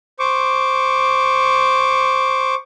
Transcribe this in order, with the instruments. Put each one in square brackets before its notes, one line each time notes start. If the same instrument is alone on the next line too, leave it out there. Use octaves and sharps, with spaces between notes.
[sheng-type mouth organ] C5 C#6 D6